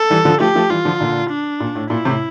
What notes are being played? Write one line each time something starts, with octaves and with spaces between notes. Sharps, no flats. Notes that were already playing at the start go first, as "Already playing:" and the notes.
Already playing: A4
E3 G3
D3 F3
F3 A3 G4
F3 A3
E3 G3 F4
D3 F3
A#2 D3
D4
A#2
A2
A#2 E4
A2 C3